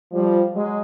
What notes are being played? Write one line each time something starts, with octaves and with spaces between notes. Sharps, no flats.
F3 G3
F#3 G#3